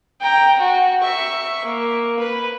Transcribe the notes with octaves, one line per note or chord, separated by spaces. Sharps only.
G5 A#5
F#4
E5 C#6
A#3
B4